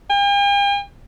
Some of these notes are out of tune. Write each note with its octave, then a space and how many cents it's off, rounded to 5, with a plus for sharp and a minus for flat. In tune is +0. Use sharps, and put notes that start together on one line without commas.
G5 +45